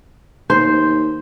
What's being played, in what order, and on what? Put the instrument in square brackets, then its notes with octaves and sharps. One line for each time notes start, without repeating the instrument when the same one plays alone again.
[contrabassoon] D#2 [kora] C5